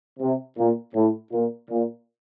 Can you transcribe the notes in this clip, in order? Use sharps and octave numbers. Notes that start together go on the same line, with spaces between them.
C3
A#2
A2
A#2
A#2